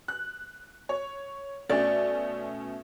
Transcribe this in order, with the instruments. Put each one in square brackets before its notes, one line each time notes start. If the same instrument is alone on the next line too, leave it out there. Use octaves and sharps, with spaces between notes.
[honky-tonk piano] F#6
C#5
[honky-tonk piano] B2 A3 C#4 [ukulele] D5